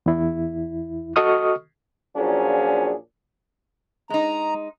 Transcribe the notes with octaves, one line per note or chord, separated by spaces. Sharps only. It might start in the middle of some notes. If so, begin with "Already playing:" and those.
E2 E4
F#4 A4 D#5 C#6 D#6 F6
A#2 F3 F#3 C#4 D4 G#4
G#3 D#4 A#5